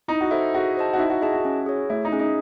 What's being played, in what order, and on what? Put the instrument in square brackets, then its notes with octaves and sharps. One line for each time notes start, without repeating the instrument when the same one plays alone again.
[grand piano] D#4 [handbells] E4
[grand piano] F#4
[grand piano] E4 [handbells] A4 C5
[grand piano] F#4 [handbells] G#4
[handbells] C5 D#5 A5
[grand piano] F#4
[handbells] D#4 [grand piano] E4
[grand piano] F#4
[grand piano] E4 [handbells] G#4 D#5 A5
[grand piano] F#4
[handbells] C#4
G#4 C#5
[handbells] A3 [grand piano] E4
[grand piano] D#4
[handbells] C#4 G#4
[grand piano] D#4